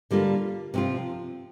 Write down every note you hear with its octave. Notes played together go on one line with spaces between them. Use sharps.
D3 G3 A#3 F4
C3 F3 C4 F4